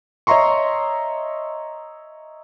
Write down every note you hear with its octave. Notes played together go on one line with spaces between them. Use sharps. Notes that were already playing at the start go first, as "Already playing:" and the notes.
C#5 D#5 E5 A#5 C6 C#6